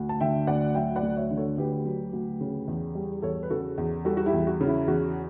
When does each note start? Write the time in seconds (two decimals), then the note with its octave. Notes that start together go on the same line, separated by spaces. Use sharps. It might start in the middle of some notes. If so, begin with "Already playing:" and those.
Already playing: D2
0.09 A5
0.21 D3 E5 G5
0.47 D2 D5 F#5
0.75 F#3 E5 G5
0.96 D5 F#5
1.02 D2
1.17 C#5 E5
1.31 D3
1.37 A4 C#5
1.58 D2 G4 B4
1.85 F#3
2.13 D2
2.41 C#3
2.68 E2
2.95 G3
3.22 E2 A4 C#5
3.43 B4
3.50 C#3 F#4 A4
3.78 E2
4.05 G3 F#4 A4
4.17 F#4
4.26 E4 G4
4.33 E2
4.47 F#4
4.61 C#3
4.67 E4
4.87 E2 F#4